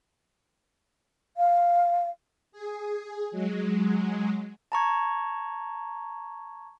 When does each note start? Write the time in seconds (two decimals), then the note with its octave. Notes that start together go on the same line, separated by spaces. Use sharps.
1.37 F5
2.52 G#4
3.31 F#3 G#3
4.72 A5 A#5 C#6 G#6